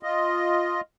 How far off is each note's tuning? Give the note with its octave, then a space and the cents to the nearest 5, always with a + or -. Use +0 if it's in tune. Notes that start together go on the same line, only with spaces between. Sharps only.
F4 +0 D#5 +0